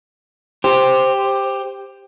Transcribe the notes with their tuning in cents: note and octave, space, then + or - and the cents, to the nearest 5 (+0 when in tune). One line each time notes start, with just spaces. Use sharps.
G4 +10 C5 +0